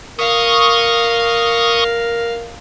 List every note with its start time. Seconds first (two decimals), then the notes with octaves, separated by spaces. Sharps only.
0.19 A#4 F5 C#6 D#6